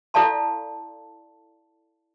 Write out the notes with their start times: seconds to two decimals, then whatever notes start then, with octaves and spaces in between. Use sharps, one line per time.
0.14 E4 A4 D5 F5 A5 C6